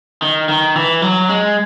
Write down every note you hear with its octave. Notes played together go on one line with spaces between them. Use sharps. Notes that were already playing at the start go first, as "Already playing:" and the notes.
D#3
D#3
E3
F#3
G#3